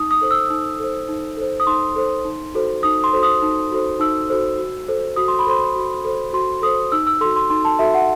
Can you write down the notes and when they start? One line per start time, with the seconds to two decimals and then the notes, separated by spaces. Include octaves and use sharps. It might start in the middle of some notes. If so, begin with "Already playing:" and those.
Already playing: D#4 D#6
0.11 D#6
0.21 A4 C5
0.31 E6
0.50 D#4
0.80 A4 C5
1.09 D#4
1.37 A4 C5
1.60 D#6
1.67 D#4 C6
1.96 A4 C5
2.25 D#4
2.55 F#4 A4 C5
2.83 D#4 D#6
3.04 C6
3.13 F#4 A4 C5
3.23 D#6
3.42 D#4
3.72 F#4 A4 C5
4.00 D#4 E6
4.30 F#4 A4 C5
4.58 F#4
4.88 A4 C5
5.16 F#4 D#6
5.28 C6
5.39 B5
5.47 A4 C5 C6
5.76 F#4
6.05 A4 C5
6.33 F#4 C6
6.62 A4 C5 D#6
6.92 D#4 E6
7.07 E6
7.21 F#4 A4 C6
7.36 C6
7.50 D#4 C6
7.65 A5
7.79 F#4 A4 E5
7.94 F#5